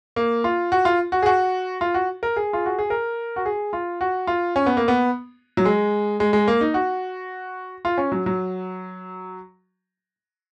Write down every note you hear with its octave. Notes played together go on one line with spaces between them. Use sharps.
A#3
F4
F#4
F4
F#4
G#4
F#4
F4
F#4
A#4
G#4
F4
F#4
G#4
A#4
F#4
G#4
F4
F#4
F4
C#4
B3
A#3
B3
F#3
G#3
G#3
G#3
A#3
D#4
F#4
F4
C#4
F#3
F#3